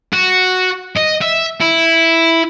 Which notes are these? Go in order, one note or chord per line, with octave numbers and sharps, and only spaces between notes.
F#4
D#5
E5
E4